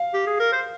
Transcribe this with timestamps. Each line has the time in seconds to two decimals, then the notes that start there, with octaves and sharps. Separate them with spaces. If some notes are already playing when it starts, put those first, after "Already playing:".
Already playing: F5
0.14 G4
0.27 G#4
0.40 A#4
0.53 C5